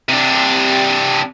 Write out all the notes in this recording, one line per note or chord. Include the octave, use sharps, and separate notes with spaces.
C3 D4